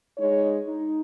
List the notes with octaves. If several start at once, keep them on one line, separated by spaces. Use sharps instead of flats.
G#3 D#4 C#5
D#4